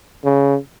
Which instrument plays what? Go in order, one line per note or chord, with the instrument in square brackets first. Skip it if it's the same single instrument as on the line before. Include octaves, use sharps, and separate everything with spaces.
[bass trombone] C#3